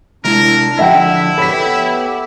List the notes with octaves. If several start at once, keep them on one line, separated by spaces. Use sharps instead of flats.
C3 G#3 D4 E4 A#4
D3 F3 E4 E5 F#5 G5
B3 G4 A4 C#5 E5 B5 B6